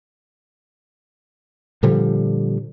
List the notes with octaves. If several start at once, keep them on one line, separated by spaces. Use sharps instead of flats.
A#2 D3 F3 G3